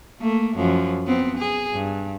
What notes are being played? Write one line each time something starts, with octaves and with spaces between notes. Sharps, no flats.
A3 A#3
F#2 F3
F3 B3 C4
G#4
G2